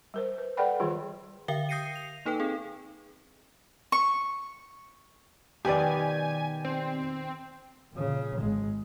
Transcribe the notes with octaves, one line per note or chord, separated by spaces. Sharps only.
G3 A#4 C5
B4
A4 B4 D5 F#5 G5 B5
D#3 E3 G3 F4 G#4
D3 A#4 E5 F5 G5 G7
D#6 G6 A#6 C7 C#7 D#7
F7
A#3 D#4 A4 B4 G5
C4 G#4
C#6
B2 D#3 G4 B4 D5 G#5
C4
A#2 C#3
G#1 G#3